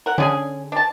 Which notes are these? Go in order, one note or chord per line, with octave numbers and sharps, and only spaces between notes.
A#4 F#5
D3 C#4 G#4 G#5
D4 A5